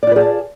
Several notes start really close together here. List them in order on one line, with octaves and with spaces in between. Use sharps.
D5 F4 B4 G#4 A5